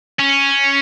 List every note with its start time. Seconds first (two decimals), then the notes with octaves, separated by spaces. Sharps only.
0.19 C#4